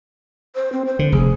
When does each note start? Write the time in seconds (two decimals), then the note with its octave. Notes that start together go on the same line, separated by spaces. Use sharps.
0.56 C5
0.72 C4
0.86 C5
0.99 D3
1.12 F1 G#4